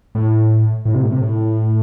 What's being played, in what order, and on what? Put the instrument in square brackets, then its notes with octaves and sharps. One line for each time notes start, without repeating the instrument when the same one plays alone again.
[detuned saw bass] A2
A2
C3
A2
C3
A2